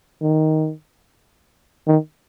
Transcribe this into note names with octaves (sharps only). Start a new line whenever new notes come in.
D#3
D#3